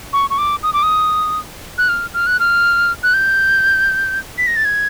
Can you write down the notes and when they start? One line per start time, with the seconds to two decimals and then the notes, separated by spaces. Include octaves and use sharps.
0.13 C#6
0.30 C#6
0.38 D6
0.63 D#6
0.73 D6
0.83 D#6
1.78 F#6
1.89 F6
2.14 F6
2.27 F#6
2.40 F6
3.03 F#6
3.14 G6
4.38 B6
4.47 A#6
4.56 A6
4.65 G#6